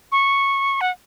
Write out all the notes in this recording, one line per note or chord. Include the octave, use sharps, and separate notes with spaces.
C#6
F#5